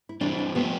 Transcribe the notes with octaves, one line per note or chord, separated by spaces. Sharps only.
E4
E3 G3 C4 D4
D4
F3 A3 B3 C4 G4